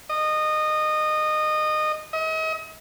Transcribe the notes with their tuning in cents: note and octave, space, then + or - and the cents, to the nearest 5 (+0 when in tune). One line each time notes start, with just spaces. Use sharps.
D#5 -20
D#5 +40